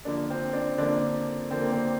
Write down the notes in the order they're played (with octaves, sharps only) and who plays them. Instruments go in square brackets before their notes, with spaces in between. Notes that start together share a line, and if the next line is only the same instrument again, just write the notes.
[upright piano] D3 F3 A#3 D4
C4
D4
D3 F3 A#3 D4
D3 F3 A#3 C4
A#3
C4